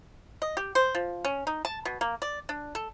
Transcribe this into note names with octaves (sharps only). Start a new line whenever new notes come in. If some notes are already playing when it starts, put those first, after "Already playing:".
D#5
G4
C5
F3
C#4
D#4
A5
B2
A#3
D5
D4
A4